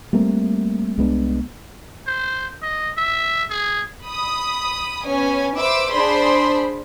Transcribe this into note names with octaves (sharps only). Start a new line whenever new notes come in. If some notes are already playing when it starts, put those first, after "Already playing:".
G3 A3 A#3 C4
C2 G#3 B3 D4
C5
D#5
E5
G#4
B5 D#6
B3 C#4 G#5
B4 C5 E5 D6 E6
D4 G#4 C5 D5 B5 C6